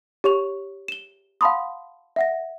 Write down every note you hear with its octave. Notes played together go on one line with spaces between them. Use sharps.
G4 C#5 C#6 F7
E7 G7
F5 F#5 A5 B5 C6 D#6
E5 F#5 A#6